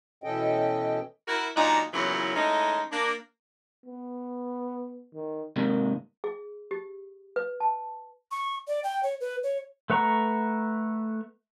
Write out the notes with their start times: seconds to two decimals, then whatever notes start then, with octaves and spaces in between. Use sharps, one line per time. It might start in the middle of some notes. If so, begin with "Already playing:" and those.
0.24 B2 E3 C#4 A4 D#5 G5
1.28 E4 F#4 A#4
1.56 A#2 F#3 G#3 D4 D#4
1.93 E2 A#2 C#3 E3 F#3 C#4
2.36 E3 G#3 A3 C#4 D#4
2.92 A#3 D4
3.86 B3
5.14 D#3
5.56 G#2 C3 D#3 A#3
6.24 G#4
6.71 G4
7.36 B4
7.60 A5
8.31 C#6
8.67 D5
8.84 G5
9.03 C#5
9.20 B4
9.43 C#5
9.90 A3 B4 F#5 A#5 C#6